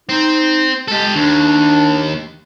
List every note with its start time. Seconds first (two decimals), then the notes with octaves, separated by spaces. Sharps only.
0.09 C4 D#4
0.88 G#3 G4 A4
1.16 D#2 D4